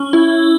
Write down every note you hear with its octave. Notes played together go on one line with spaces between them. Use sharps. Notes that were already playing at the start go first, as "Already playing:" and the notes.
Already playing: C#4
E4